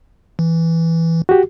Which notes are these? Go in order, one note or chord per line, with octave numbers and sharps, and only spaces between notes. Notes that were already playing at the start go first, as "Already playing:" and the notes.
E3
F#4 G4